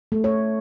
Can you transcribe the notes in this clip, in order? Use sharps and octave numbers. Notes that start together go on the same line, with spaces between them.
A3
C#5